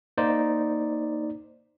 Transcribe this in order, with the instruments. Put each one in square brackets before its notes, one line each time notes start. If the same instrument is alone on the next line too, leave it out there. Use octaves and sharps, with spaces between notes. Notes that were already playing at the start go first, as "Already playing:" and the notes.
[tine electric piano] A#3 D#4 C5 D5